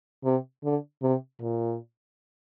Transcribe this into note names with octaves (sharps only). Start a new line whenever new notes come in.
C3
D3
C3
A#2